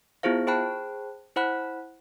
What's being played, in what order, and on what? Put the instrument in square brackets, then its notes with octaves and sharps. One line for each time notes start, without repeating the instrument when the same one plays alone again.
[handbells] B3 E4 F4 G#4 C5 F5
G#4 C5 G5 A5 B5 F#6
E4 C5 F#5 B5 F#6